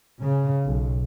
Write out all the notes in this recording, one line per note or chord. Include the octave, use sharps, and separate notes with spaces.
C#3
B1